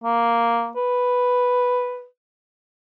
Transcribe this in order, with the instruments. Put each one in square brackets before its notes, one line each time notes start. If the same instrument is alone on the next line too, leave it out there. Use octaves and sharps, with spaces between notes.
[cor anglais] A#3
B4